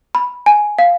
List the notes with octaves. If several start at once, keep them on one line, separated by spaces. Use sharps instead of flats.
B5
G#5
F5